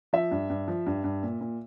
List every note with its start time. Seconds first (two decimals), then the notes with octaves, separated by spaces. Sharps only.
0.13 F3 E5
0.31 G2
0.50 G2
0.68 F3
0.87 G2
1.04 G2
1.23 A#2
1.41 A#2